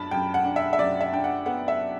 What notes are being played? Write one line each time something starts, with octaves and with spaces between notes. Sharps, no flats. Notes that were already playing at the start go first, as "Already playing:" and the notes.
Already playing: F#2 D4 A5 B5
F#2 G5
F#5
D4
E5
E5
F#2 D5
E5
D4 G5
F#5
B3 F#5
E5